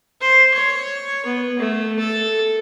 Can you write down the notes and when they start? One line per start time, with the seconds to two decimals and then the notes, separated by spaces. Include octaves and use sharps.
0.21 C5
0.54 C#5
1.26 B3
1.59 A3
1.99 A4